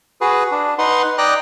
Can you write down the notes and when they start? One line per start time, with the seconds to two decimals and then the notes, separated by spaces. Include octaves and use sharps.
0.21 F#4 G#4 B4
0.52 D4
0.78 D#4 B4 F#5 C6
1.18 D5 D#5 G5 A#5 F#6